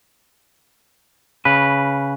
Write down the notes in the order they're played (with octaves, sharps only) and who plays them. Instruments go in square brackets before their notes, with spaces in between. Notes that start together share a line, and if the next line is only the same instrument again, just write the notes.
[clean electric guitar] C#3 B4